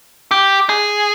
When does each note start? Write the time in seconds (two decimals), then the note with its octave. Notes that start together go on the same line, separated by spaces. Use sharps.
0.31 G4
0.69 G#4